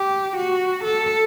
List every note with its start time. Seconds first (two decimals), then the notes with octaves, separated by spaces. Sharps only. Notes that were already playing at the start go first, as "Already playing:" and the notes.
Already playing: G4
0.37 F#4
0.84 A4